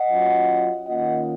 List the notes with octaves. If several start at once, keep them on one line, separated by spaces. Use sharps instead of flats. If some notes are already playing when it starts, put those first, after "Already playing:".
Already playing: D#5 F#5
F#3 C#4 F4
D#3 A#3 C#4 F4 D#5 F#5